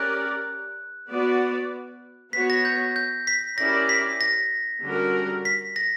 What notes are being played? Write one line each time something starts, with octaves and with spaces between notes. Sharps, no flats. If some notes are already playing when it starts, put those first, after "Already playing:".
Already playing: C#4 G4 A#4 D5 F#6
B3 F#4 B4 D5
B3 F#4 C#5 B6
A#6
G6
G6
B6
C#4 E4 G4 A#4 D5 A#6
B6
A#6
D3 G3 C#4 F#4 A#4
B6
A#6